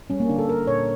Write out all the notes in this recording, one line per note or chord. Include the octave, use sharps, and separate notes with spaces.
G3 C#4
A#3
D3 D4
A4
A#3 A#4
A#2 C#5